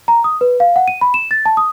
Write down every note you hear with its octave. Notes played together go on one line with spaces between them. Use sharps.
A#5
D#6
B4
F5
F#5
D#7
B5
E7
A6
A5
D#6